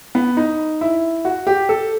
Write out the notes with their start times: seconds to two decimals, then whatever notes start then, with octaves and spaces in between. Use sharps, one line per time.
0.15 B3
0.37 D#4
0.81 E4
1.25 F#4
1.47 G4
1.69 A4